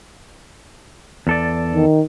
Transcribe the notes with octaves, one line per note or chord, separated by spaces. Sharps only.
E2 A4 D5
D#3